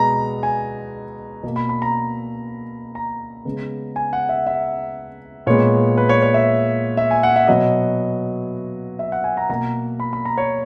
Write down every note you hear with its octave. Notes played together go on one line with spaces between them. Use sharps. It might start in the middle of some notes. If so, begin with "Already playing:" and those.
Already playing: B2 G#3 B3 A#5
G#5
B2 A#3
B5
B5
A#5
A#5
C#3 G#3 B3
G#5
F#5
E5
E5
A#2 G#3 B3 C#5
B4
C#5
C#5
E5
E5
G#5
F#5
E5
B2 F#3 B3 D#5
E5
F#5
G#5
A#5
B2 A#3 A#5
B5
B5
A#5
C#5